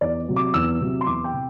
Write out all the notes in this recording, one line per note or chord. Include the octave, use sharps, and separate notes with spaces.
E2 D5
C3 F#3
D6
E2 E6
C3 F#3
C6
E2 D6
G5
C3